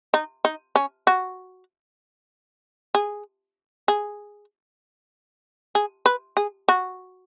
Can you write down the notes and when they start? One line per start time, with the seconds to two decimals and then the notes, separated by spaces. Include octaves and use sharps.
0.14 D#4
0.45 D#4
0.76 C#4
1.07 F#4
2.95 G#4
3.88 G#4
5.75 G#4
6.06 B4
6.37 G#4
6.68 F#4